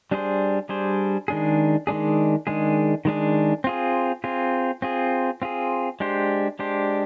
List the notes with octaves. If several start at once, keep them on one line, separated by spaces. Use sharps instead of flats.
G3 D4 G#4 C5
G3 D4 G#4 C5
D#3 G#3 D4 G#4
D#3 G#3 D4 G#4
D#3 G#3 D4 G#4
D#3 G#3 D4 G#4
C4 F4 G#4
C4 F4 G#4
C4 F4 G#4
C4 F4 G#4
G#3 D4 G4 C5
G#3 D4 G4 C5